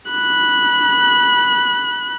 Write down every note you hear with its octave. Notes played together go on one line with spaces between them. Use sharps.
B5 F#6